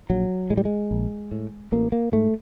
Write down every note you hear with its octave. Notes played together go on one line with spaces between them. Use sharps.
A#1 F#3
A2 G#3
G3
G#3
A#1
A2
A1 A#3
A#3
G#2 A3